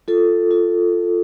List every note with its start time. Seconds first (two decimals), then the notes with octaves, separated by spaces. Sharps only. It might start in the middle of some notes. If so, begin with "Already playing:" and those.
0.08 F4 A4
0.51 F4